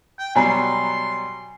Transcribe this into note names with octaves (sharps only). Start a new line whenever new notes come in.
G5
B2 F#3 G3 G#5 A#5 C6